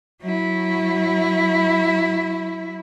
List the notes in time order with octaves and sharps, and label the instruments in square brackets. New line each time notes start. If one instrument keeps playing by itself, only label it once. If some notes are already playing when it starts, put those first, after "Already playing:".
[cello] F#3 E4